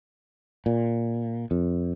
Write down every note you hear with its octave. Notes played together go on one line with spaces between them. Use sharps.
A#2
F2